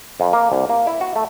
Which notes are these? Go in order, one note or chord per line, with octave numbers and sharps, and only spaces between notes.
F2
A#3
C2
A#3
E4
F#4
A3